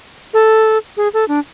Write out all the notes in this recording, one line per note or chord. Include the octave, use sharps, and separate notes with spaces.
A4
G#4
A4
D4